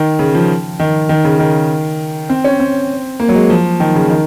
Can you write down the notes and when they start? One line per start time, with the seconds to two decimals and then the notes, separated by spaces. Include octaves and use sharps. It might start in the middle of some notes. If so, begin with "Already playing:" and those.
Already playing: D#3
0.19 C#3
0.34 F3
0.80 D#3
1.09 D#3
1.24 C#3
1.39 D#3
2.29 C4
2.44 C#4
2.60 C4
3.20 A#3
3.29 F#3
3.35 G#3
3.50 F3
3.80 D#3
3.95 C#3
4.10 D#3